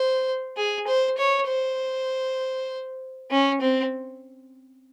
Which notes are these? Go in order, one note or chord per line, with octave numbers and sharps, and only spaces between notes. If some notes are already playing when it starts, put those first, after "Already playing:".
Already playing: C5
G#4
C5
C#5
C5
C#4
C4